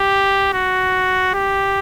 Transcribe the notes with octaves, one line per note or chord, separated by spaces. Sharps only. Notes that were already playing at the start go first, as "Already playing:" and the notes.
Already playing: G4
F#4
G4